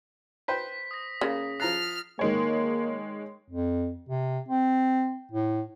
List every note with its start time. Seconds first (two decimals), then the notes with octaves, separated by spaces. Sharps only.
0.48 B4 C5 G5 B6
0.91 D#6 A#6
1.21 C#3 A#3
1.60 F3 A#5 F6 F#6 A6 C7
2.19 D#3 G#3 A#3 C#5
3.49 F2
4.09 C3
4.49 C4
5.31 A2